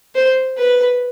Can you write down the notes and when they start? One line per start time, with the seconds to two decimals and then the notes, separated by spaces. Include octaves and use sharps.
0.15 C5
0.57 B4